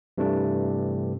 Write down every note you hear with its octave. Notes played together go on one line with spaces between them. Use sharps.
G2 C3 E3 A3 D4